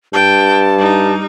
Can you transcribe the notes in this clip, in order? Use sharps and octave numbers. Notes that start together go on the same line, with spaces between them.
G2 G5 A5
G3 D#4